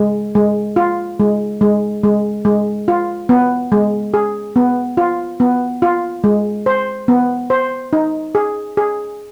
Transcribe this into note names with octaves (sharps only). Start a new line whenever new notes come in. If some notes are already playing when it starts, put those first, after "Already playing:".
Already playing: G#3
G#3
F4
G#3
G#3
G#3
G#3
F4
B3
G#3
G#4
B3
F4
B3
F4
G#3
C5
B3
C5
D#4
G#4
G#4